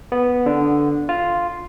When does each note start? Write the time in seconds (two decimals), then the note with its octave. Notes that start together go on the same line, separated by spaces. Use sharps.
0.12 B3
0.46 D3
1.09 F4